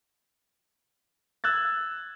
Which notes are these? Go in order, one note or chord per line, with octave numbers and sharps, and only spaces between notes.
E6 F#6 G#6 A6